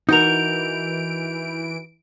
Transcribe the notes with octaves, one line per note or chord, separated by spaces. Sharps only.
E3 D#4 F#4 A#4 G6 D7 F7